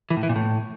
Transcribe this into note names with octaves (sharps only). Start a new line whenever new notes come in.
E3
A2
E3
A#2
A2